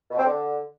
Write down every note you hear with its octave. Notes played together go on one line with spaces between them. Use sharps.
B2
C4
D3